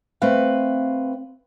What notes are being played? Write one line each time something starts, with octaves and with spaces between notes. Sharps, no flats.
A3 C4 B4 F5